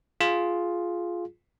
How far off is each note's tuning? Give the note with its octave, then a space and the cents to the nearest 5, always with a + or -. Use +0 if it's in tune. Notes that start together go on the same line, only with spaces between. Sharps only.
F4 +0 G#4 +10